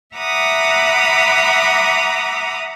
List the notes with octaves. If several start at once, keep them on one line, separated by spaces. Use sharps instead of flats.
E5 F#5 A#5 B5 D6 D#6